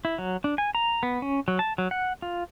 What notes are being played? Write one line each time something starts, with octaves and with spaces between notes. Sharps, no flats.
E4
F#3
D4
G#5
A#5
B3
C#4
F#3
A5
F#3
F#5
F4